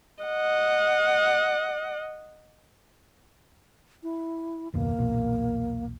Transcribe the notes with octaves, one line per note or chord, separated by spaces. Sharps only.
D#5 F#5
E4
F#1 D#2 B2 A#3
B1 E2 A#2